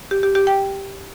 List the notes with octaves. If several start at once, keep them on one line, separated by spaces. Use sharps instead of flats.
G4
G4
G4
G5